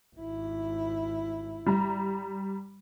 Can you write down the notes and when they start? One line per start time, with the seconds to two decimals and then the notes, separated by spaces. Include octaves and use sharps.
0.15 G#1 E4
1.66 G3 A#5